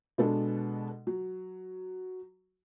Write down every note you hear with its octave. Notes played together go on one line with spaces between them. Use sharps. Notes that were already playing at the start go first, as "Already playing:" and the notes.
B2 G#3 B3 D4 A4
F#3